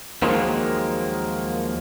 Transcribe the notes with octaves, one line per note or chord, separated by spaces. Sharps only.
D#2 D#3 F3 F#3 G#3 A#3